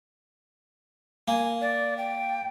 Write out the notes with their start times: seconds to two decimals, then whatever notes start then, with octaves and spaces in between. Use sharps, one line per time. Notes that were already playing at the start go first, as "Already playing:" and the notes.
1.28 A#3 G#5
1.61 D5
1.98 G5